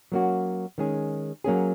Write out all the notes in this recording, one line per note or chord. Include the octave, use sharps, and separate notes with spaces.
F#3 A#3 C#4 F#4
D#3 G#3 C#4 G#4
F#3 A#3 C#4 G#4